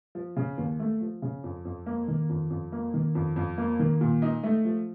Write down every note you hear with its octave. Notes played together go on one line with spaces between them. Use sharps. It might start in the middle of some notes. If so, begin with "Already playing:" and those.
F3
C#3
D#2
A3
F3
C#3
F2
F2
A#3
D#3
F2
F2
A#3
D#3
F2
F2
A#3
D#3
A#2
D#4
A3
F3